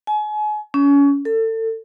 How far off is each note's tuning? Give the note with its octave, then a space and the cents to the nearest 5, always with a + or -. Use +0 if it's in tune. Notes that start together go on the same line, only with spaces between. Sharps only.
G#5 +35
C#4 +30
A4 +30